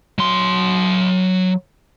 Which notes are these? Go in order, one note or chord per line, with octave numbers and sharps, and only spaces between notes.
F#3 C6